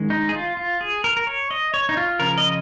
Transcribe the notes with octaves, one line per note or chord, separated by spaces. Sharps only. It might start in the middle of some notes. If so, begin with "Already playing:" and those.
Already playing: D#3 G#3 C#4
D#4
G#4
F4
F4
G#4
A#4
A#4
C#5
D#5
C#5
D#4
F4
C#3 F3 C#4 A#4
D#5